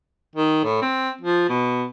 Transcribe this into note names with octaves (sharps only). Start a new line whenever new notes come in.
D#3
A2
C4
F3
B2